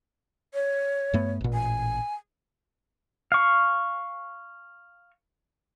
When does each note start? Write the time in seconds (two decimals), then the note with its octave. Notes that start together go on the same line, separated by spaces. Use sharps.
0.54 C#5
1.14 G2 A3 B3
1.41 A1 A#2
1.54 G#5
3.32 F5 C#6